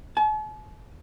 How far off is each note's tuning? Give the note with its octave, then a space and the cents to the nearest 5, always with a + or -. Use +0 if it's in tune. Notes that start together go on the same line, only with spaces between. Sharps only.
A5 -45